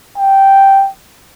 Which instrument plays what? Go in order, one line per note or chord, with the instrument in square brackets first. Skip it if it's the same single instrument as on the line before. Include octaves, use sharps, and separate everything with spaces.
[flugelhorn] G5